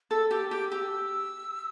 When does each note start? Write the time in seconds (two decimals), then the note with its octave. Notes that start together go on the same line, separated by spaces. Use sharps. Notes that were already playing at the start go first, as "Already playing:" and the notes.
0.11 A4 E6
0.31 G4 D6
0.51 G4 D6
0.71 G4 E6